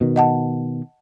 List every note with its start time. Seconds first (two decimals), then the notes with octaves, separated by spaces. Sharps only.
0.01 B2 D#3
0.16 D#5 F#5 A5